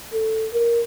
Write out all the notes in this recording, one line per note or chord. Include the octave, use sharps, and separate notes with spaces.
A4
A#4